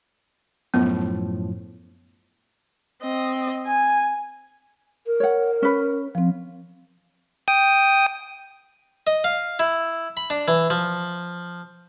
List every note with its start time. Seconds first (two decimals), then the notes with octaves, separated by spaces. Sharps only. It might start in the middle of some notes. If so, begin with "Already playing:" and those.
0.74 F#2 A2 F3 B3
3.03 C4 D#5
3.66 G#5
5.06 A#4
5.20 C#5 F#5
5.62 C#4 B4
6.15 F3 C4
7.48 G5 D#6
9.07 D#5
9.24 F5
9.59 E4
10.17 B5
10.30 D4
10.48 E3
10.70 F3